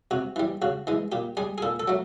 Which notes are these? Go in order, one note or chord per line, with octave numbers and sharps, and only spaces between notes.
C3 F#4
E3 G3
C#3 F#4
E3 G#3
A#2 G4
G3 G#4
G#4
A#2 A4
A4
F#3 A3